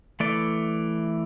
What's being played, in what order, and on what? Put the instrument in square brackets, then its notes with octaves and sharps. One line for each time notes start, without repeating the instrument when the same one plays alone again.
[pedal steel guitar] E3 A3 D5